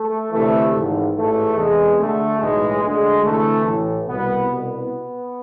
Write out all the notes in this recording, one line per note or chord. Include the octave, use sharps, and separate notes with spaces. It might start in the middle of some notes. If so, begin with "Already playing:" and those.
Already playing: A3
D2 C3 E3 A3
G#1 G#2 E3
A1 G#2 E3 A3
E2 C3 E3 G#3
D2 D3 A3
B1 A2 E3 G#3
D2 D3 G#3
D2 C3 E3 A3
A1 A2 E3
C2 B2 B3
C2 B2 B3